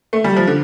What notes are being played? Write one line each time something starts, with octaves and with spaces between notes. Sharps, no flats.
A3
G3
F3
D3